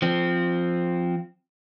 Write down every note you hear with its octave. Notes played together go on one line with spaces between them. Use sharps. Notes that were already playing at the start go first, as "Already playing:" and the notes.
F3 C4